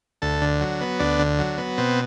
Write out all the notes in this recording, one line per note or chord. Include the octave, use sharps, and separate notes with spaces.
D2 A4
D3
F#3
B3
D2 D4
D3
F#3
B3
B2 C4